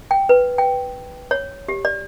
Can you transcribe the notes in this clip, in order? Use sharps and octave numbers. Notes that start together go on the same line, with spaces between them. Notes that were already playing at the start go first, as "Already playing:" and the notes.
G5
B4
G5
C#5
G4
D5